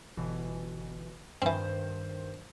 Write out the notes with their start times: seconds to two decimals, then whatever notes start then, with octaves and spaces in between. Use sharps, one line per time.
0.17 G1 B2 E3
1.42 G2 D#3 E3 C4 C5